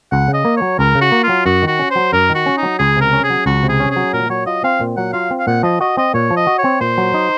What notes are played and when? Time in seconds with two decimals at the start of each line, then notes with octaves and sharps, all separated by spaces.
0.12 C#2 F#5
0.28 C#3
0.34 D#5
0.45 A#3
0.57 C#5
0.62 F#3
0.79 C#2 A#4
0.95 C#3
1.01 F#4
1.12 A#3
1.23 F4
1.29 F#3
1.46 F#2 F#4
1.62 D#3
1.68 F#4
1.79 C#4
1.91 C5
1.96 F#3
2.13 F#2 A#4
2.30 D#3
2.35 F#4
2.46 C#4
2.58 D#4
2.63 F#3
2.79 C#2 G#4
2.96 C3
3.01 A#4
3.13 C#4
3.24 G#4
3.30 F#3
3.46 C#2 F#4
3.63 C3
3.69 G#4
3.80 C#4
3.91 G#4
3.96 F#3
4.13 A#2 A#4
4.30 F#3 C#5
4.46 F4 D#5
4.64 C4 F5
4.81 A#2
4.97 F#3 F#5
5.13 F4 F5
5.31 C4
5.40 F5
5.47 A#2 F#5
5.63 F3 D#5
5.81 F#4 D#5
5.97 C4 D#5
6.14 A#2 C#5
6.31 F3
6.37 D#5
6.47 F#4
6.58 C#5
6.64 C4
6.81 A#2 C5
6.98 F#3
7.14 D#4